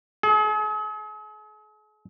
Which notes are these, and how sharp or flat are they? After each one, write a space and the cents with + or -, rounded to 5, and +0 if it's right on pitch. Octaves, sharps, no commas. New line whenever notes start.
G#4 +45